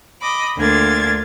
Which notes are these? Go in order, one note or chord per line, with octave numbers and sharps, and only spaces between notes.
D#5 B5 D6
D2 D3 A#3 F4 G#6 A6